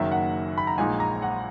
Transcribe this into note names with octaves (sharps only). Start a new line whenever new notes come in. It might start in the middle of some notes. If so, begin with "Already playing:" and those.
Already playing: F#1 F#2 D#3 F#3 A#3 E5
F#5
B5
A#5
A#1 A#2 G#3 D#4 G#5
A#5
F#5